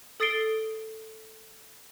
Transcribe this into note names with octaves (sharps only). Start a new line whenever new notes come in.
A4 D#6 A6 C7 D7 G7